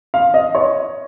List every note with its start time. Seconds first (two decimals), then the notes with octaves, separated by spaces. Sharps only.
0.14 F5
0.34 D#5
0.55 C#5